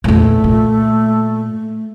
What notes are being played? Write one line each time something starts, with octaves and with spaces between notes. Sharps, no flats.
E2 A#2 A3
A#2